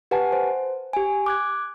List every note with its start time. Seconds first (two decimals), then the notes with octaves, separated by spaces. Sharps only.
0.11 G4 B4 F#5 G#5 A5
0.33 C5
0.93 G4 G#5
1.26 D6 F#6 G#6